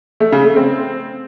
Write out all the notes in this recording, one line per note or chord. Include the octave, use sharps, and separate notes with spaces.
A3
C#3
A3
C4